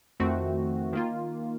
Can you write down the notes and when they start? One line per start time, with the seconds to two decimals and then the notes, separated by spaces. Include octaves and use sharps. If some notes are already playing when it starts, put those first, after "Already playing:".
0.20 F2 D#3 A3 C4 F#4
0.93 D#3 A#3 F4